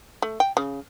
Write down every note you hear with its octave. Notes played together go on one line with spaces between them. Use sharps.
A3
G5
C#3